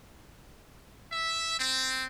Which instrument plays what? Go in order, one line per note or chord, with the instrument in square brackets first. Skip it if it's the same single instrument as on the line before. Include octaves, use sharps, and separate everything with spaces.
[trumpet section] E5
C4